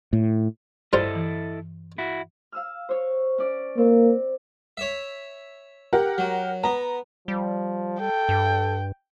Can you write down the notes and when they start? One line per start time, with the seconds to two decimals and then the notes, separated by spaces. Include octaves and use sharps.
0.13 A2
0.93 G2 G3 E4 F4 A4 C5 D#5
1.15 E3
1.98 E4 F#4
2.52 F5 E6 F6
2.89 C5 C#5
3.38 C#4 D5
3.78 A#3 C4
4.77 C#5 E5
5.93 G4 A#4 F#5
6.18 F#3
6.64 B3 A#5
7.28 F3 G3
8.00 A4 G5
8.29 G2